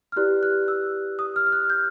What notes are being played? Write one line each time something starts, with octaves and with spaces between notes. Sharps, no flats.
F6
E4 G4 B4 D5 F#6
F#6
E6
D#6
F6
F6
F#6
G6